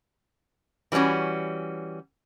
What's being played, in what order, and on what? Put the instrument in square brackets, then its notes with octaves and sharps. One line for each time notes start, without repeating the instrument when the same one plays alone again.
[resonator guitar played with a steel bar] E3 G3 B3 C#4 F#4